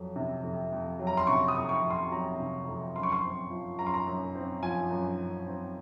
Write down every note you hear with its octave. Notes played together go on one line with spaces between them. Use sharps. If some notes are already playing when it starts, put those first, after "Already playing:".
Already playing: F2 F#3
C3
F2
F2
F#3
A#5
C6
C3 C#6
D#6
F2
C#6
F2
C6
F#3 A#5
C3
F2
F#2 C6
C#6
C6
C4
F3
F#2 A#5
C6
A#5
F#2
C4
F3 G#5
F#2
F#2
C4